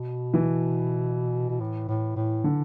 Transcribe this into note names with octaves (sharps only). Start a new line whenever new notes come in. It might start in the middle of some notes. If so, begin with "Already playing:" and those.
Already playing: B2
E3
B2
A2
A2
A2
D3